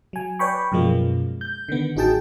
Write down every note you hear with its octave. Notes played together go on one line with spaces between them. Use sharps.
F#3 G#5
B4 C#5 D5 G5 B5 C#6
F#2 B2 F3 G#3 A#3
G6
D3 D#3 B3
A1 D#4 F#4 G#4 G5 A5